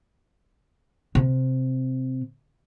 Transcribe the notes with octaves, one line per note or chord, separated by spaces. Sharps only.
C3